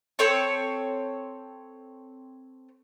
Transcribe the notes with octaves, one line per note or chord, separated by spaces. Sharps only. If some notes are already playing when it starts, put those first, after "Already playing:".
C4 A4 C#5 C#6